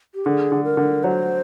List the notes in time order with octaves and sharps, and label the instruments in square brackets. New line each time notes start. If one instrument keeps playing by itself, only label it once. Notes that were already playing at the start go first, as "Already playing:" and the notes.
[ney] G4
[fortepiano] D3 [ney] G#4
[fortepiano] D3
[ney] A#4
[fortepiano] D3
[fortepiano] F#3 [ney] C5